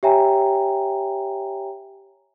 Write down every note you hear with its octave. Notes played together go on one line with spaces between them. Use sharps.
G4 C#5 E5 G5 G#5 A#5